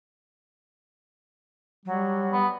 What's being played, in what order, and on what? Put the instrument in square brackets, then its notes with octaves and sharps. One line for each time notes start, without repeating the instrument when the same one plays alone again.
[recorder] F#3 [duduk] G3
[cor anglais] B3